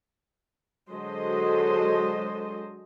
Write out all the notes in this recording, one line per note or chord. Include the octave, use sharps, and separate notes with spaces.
D3 F#3 G#3 A4 C5 D#5